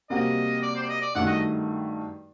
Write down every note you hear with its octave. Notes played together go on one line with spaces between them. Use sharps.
C3 G3 A#3 F#4 D#5
D5
C5
D5
D#5
D5
G2 D#3 A3 D#4 F#4 F#5
D#5